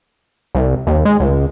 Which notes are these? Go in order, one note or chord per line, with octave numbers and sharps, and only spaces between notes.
C2
D#2
G#3
C#2